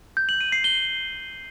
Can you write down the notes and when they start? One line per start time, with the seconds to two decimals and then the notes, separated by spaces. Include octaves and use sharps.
0.17 G6
0.29 F#7
0.41 D#7
0.52 C7
0.64 G7